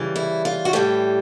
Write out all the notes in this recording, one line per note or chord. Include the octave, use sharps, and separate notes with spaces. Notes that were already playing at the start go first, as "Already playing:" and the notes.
Already playing: C#3 E3 G3
E4
F4
F#4
A2 E3 G3 G4